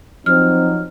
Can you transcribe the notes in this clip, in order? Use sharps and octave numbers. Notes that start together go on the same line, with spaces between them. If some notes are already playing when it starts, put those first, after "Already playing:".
F3 F#3 C4 D#4 F6